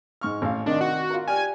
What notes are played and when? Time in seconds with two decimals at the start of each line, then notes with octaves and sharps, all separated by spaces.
0.21 G#2 C#6 F6
0.42 A1 F5
0.66 C3 D#3 D4 D#5
0.81 F#4
1.10 F4 A#4
1.28 G4 D5 G#5 F6